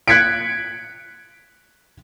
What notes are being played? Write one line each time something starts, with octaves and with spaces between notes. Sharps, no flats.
F#6 G#6 B6 C#7 D7